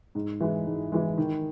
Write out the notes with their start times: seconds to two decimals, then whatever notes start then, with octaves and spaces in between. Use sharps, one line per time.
0.15 G#2
0.41 E3 G#3
0.67 G#2
0.92 E3 G#3
1.18 D#3